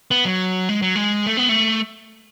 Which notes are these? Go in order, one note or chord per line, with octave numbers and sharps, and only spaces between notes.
B3
F#3
G#3
F#3
G#3
A3
B3
A3